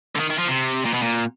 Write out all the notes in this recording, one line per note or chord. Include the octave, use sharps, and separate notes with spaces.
D3
D#3
D#3
F3
C3
A#2
B2
A#2